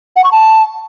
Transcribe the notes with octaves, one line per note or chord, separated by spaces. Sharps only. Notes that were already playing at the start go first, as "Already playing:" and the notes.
F#5
C#6
A5